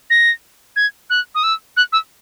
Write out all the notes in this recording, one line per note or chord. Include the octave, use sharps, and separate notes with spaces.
A#6
G#6
F#6
D#6
E6
F#6
E6